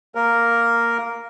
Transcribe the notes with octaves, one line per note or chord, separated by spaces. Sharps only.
A#3 A#4